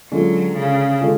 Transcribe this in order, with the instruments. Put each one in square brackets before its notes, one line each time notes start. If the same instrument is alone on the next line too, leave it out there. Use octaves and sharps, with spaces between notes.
[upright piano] D3 G#3 C#4 F4 A4 [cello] F#3
[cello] C#3
[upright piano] D3 G#3 C#4 F4 A4